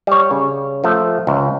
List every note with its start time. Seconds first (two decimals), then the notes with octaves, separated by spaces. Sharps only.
0.07 G3 C#5
0.31 C#3
0.84 F3 A3
1.27 C#2